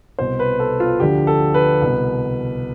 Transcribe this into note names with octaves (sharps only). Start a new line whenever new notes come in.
C2 B2 C5
B4
A4
F4
D2 D3 F3 G4
A4
B4
C2 B2